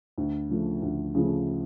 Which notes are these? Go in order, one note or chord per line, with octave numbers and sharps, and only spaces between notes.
D2
C#3 F3 A3
D2
C#3 F3 A3